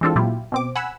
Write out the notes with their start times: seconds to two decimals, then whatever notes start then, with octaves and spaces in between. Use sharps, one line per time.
0.01 E3 G#3 C4 D4 F4 A4
0.16 A#2 F#3 E4 F4 G4
0.52 B2 C4 D6
0.76 F#5 G#5 B5 E6